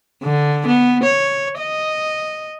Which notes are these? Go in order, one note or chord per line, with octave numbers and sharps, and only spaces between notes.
D3
B3
C#5
D#5